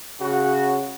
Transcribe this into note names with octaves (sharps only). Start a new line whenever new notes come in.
C#3 F#4